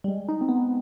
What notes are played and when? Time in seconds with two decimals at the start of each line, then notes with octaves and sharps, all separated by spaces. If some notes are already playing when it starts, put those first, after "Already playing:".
0.04 G3
0.08 G#3
0.29 D#4
0.41 C4
0.49 B3